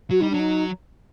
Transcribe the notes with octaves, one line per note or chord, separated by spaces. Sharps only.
F#3 F#4
G3 D#4
F#3 D4
D#4